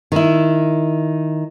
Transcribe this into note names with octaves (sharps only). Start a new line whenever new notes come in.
D#3 E4